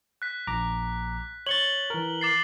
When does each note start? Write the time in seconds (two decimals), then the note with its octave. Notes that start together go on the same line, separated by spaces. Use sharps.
0.22 F#6 B6
0.47 A#1 A#5 D6
1.47 C#5 C#6 A6 F#7 G7
1.90 E3 A#4
2.21 D6 A6 C7